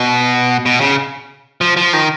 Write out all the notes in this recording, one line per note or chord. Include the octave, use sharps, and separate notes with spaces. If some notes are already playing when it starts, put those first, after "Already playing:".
Already playing: B2
B2
C#3
F3
F3
D#3